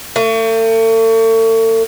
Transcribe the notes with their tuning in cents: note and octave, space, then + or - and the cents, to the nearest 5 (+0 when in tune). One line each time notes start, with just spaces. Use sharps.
A3 +40